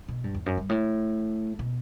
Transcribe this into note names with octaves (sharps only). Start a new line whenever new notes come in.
B2
G2
E2
F#2
G2
A2
B2